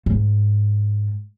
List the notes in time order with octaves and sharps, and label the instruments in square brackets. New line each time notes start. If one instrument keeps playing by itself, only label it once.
[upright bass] G#2